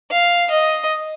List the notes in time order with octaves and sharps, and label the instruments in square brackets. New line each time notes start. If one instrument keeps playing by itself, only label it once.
[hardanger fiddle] F5
D#5